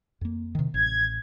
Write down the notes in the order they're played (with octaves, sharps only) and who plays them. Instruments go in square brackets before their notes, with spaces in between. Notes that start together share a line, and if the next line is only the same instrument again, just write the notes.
[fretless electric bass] F2 A#3
C3 D#3
[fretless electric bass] A1 [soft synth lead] G#6